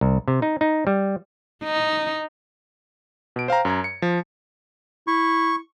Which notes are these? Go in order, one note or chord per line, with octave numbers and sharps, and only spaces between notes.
C2
C3
D#4
D#4
G3
D#4
B2 D7
C5 F5 G5 A#5
F#2 A#5 G#6
C#7
F3
E4 C#6